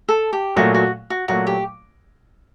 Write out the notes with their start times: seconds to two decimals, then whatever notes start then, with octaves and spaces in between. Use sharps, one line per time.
0.09 A4
0.33 G4
0.56 A#2 F#3 A3 F#4
0.74 F#4
1.10 F#4
1.28 A#2 F#3 A3 F#4
1.47 G4